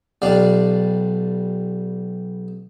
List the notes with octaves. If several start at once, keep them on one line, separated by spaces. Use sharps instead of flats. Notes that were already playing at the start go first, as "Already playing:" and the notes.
B1 G3 D4 F4 D5 F5